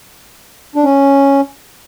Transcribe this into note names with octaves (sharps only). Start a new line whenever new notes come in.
D4
C#4